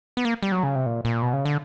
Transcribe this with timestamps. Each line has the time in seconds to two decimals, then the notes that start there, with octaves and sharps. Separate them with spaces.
0.17 B3
0.25 A#3
0.43 G3
0.52 F#3
0.63 C#3
0.75 C3
0.86 A#2
1.05 A#2
1.22 B2
1.33 C#3
1.45 D3